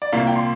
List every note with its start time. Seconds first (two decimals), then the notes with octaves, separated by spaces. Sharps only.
0.02 D5
0.13 C2 A#2 A#3 F5
0.27 G5
0.36 C6